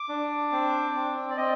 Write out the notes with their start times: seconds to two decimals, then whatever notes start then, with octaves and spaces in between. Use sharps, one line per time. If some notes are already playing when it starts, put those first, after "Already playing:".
Already playing: D6
0.09 D4
0.52 C4
0.95 C4
1.30 D5
1.37 C4 D#5